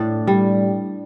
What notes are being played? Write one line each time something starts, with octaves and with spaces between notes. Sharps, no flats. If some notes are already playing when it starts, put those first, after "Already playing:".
Already playing: A2 D4
G3